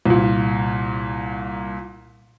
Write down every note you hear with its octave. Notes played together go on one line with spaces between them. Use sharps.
C2 A#2